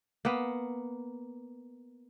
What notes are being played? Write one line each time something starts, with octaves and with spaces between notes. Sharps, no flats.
A#3 B3